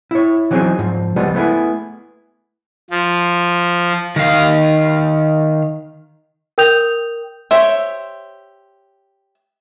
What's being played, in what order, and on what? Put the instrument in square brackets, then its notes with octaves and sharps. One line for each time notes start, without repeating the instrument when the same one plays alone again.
[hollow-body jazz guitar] E4 C#5
E3 F#3 C4 D#4 G#4
G#2 F3
C#2 F3 G3 G#3 B3
A3 B3 E4 G#4
[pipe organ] F3
[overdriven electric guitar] D#3 F5
[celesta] A#4 G5 D#6 G6 F7
[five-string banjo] G4 C5 C#5 E5